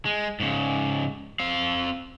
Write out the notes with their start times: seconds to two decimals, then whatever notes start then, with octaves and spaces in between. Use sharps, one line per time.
0.05 G#3
0.40 G#2 C#3
1.39 C4 F5